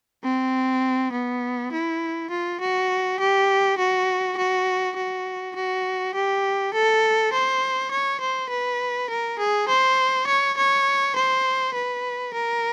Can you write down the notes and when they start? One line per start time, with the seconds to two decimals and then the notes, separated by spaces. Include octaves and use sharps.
0.24 C4
1.12 B3
1.72 E4
2.30 F4
2.60 F#4
3.20 G4
3.78 F#4
4.37 F#4
4.96 F#4
5.56 F#4
6.15 G4
6.74 A4
7.33 C5
7.91 C#5
8.21 C5
8.50 B4
9.10 A#4
9.39 G#4
9.68 C5
10.27 C#5
10.57 C#5
11.16 C5
11.74 B4
12.34 A#4